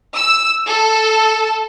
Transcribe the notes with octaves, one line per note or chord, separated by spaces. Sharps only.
E6
A4